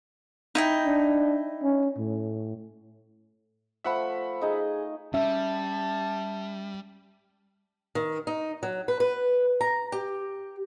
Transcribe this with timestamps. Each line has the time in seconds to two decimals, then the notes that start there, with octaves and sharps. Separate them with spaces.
0.55 D#4 E4 G5
0.86 D4
1.63 C#4
1.98 A2
3.84 F3 A3 E5 F#5 B5
4.41 D#4 G#4 D#5
5.14 G3 C#4 E5 A5
7.95 D#3
8.27 D#4
8.63 F#3
8.88 B4
9.00 B4
9.61 A#5
9.92 G4